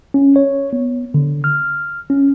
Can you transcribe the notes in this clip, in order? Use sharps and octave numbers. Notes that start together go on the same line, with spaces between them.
C#4
C#5
B3
D3
F6
C#4